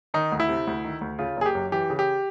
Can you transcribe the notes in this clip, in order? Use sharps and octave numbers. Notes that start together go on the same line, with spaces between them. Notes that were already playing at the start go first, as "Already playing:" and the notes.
D#3 D#4
D2
E4
C3
D2
D#3
D2
C#3 F4
F#1 G#4
G4
F#2
E3 G4
C#3
G4